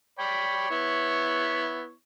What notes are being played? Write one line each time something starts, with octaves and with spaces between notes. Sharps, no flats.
C#5 D5 G5 B5
B3 E4